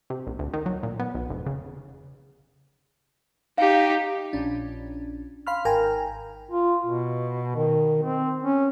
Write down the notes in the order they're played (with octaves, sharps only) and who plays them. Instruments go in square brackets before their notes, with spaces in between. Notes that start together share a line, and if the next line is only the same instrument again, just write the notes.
[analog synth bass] C3
A#1
D2
D#3
F#3
A#2
B3
B1
F1
C#3
[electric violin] D#4 G4 [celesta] F5
[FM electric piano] A#1 C#4 D4
F5 B5 C6 F6
G#1 A#4 G5 G#5 A#5
[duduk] F4
B2
D#3
C4
C#4